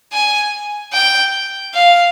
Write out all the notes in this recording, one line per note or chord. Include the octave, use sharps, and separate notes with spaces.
G#5
G5
F5